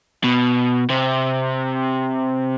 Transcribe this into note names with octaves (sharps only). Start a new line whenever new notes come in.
B2
C3